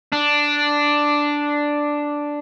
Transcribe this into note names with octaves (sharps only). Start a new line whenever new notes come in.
D4